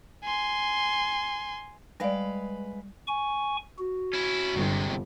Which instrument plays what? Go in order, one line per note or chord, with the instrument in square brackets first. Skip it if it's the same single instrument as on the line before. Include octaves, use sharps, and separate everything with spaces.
[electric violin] G#5 C6
[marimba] G3 D5 [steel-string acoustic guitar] G#3 B4 F5
[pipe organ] G#5 C#6
F#4
[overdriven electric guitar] C#4 E4
[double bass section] G1 [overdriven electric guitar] C3 G#3